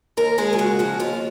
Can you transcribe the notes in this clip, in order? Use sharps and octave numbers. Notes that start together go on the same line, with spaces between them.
D#2 A#4
G#3 G#4
F4
C#3 F#4
F3 F#4
D#2 F4